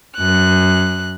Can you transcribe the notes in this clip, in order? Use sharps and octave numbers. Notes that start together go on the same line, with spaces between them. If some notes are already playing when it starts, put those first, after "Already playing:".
F#2 F#6